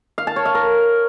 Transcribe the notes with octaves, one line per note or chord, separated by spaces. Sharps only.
F5
A5
C#5
F5
A#4